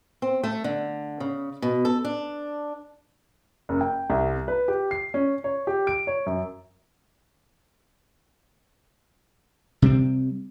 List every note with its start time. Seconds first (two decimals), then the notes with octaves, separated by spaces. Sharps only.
0.22 C4
0.43 A3
0.64 D3
1.20 C#3
1.62 B2
1.85 A4
2.05 D4
3.69 F#1
3.81 G5
4.10 C2
4.48 B4
4.68 G4
4.91 C7
5.14 C#4
5.44 C#5
5.67 G4
5.87 D7
6.07 C#5
6.26 F#2
9.82 C3 G3 C4